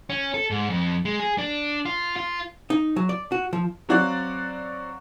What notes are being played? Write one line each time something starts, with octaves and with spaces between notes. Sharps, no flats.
C#4
A4
G#2
F2
G#3
G#4
D4
F4
F4
D#4
F#3
D5
F#4
F3
F#3 C4 F#4 D5 F5 F#6